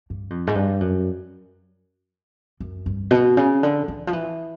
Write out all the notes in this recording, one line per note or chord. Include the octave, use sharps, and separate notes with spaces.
G2
F2
G#2
G2
F#2
F#2
G2
B2
C#3
D3
E3
F3
E3